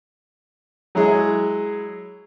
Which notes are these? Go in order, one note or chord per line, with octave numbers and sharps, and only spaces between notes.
F#3 G#3 E4 G#4